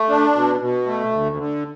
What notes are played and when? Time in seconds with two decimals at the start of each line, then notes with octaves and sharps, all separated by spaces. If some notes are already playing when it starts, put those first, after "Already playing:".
Already playing: A3
0.10 D4
0.35 B2
0.60 B2
0.86 A3
1.12 D2
1.37 D3